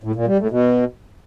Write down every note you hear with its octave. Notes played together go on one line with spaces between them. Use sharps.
A2
A#2
G3
A2
B2